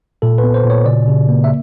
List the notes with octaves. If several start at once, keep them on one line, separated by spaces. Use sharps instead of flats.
A#2 A4
B4
B3
C5
A#2
C#5
C#3 D5
C#3
A#3
E5